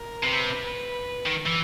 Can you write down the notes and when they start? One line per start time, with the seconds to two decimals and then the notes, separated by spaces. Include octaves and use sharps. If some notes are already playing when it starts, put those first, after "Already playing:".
Already playing: A#4
0.23 C3 B4
0.65 B4
1.26 D#3
1.46 E3